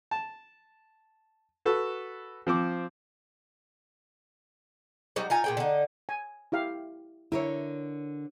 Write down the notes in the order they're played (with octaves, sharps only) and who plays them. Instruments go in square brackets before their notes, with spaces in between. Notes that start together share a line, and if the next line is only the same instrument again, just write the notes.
[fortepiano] A5
F#4 A4 B4
F3 C4 D6
[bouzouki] F#3 G3 D#4 F#4
D#4 F4 G#5 A#5
A#2 G#4 G5
D3 D#4
[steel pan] G#5
E4 G4 F5
[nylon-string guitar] D3 A#4 C#5 [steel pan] E4